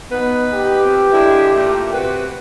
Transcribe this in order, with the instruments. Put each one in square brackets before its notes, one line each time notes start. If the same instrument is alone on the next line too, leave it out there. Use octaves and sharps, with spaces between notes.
[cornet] B3 [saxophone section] D#4 B4
[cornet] G4
[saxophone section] F3 C4
D3 G#3 E4
A#2 A3
C3 F#4 B4